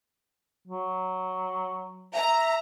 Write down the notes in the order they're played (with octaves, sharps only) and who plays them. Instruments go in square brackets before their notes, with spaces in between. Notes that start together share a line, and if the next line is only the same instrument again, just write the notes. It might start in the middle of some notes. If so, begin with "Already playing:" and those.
[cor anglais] F#3
[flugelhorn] E5 [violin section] A#5